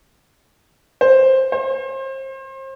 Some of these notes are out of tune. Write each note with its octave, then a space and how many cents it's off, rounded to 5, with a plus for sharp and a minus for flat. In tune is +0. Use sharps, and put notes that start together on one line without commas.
C5 +10
C5 +35